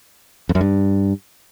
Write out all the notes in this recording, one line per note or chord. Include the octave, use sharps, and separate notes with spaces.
F2
F#2
G2